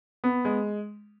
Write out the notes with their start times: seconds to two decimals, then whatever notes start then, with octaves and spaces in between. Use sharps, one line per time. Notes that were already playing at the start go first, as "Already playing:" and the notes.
0.24 B3
0.45 G#3